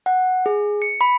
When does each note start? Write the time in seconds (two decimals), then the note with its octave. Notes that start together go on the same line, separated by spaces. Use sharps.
0.06 F#5
0.46 G#4
0.82 C#7
1.01 B5